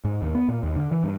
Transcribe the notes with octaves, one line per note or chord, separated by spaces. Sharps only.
G#2
D#2
B3
A#2
D#2
D3
E3
G2